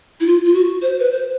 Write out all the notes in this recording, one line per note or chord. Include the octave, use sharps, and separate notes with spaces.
E4
F4
F4
F#4
C5
B4
C5